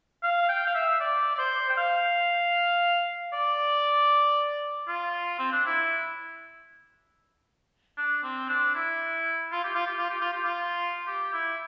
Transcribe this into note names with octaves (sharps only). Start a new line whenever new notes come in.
F5
G5
F5
E5
D5
D5
C5
G5
F5
D5
F4
C4
D4
E4
D4
C4
D4
E4
F4
G4
F4
G4
F4
G4
F4
G4
F4
G4
E4